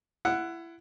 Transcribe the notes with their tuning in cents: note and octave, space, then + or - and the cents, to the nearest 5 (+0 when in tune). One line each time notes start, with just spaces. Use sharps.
E4 +25 F#5 +0